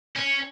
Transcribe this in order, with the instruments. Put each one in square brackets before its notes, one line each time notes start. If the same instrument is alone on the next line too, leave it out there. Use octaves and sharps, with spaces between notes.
[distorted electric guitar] C#4